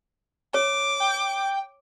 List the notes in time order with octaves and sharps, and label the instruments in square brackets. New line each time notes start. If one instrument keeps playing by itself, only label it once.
[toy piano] C#5 [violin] D6
[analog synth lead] G5